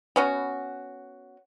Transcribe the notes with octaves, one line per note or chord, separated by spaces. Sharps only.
B3 C#4 F#4